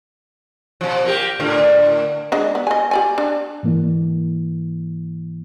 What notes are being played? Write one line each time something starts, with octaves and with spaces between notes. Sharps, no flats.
B2 F3
A#3 G4
A2 D3 A#3
G#3 D4 D#5
B3
D#5 G#5
G4 D5 G#5
D4
G#2 E3 A#3 E4